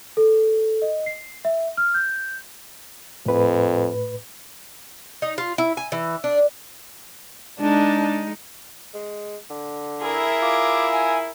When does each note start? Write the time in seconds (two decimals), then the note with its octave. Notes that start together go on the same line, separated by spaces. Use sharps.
0.17 A4
0.82 D#5
1.06 C7
1.45 E5
1.77 F6
1.94 G6
3.26 F2 A2 B4
5.22 D#4
5.38 F4
5.58 E4
5.77 G#5
5.92 E3
6.24 D4
7.60 G#3 D4 D#4 A5
8.94 G#3
9.50 D3
10.01 E4 G#4 A#4
10.42 F4 D6
10.91 G#5